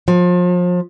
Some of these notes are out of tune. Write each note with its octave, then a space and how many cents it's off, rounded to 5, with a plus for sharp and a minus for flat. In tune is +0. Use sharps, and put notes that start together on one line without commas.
F3 +30